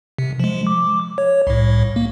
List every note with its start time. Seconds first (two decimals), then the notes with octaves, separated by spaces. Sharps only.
0.19 C3
0.40 F3 G#3
0.67 D6
1.18 C#5
1.47 C2 A2
1.96 A#3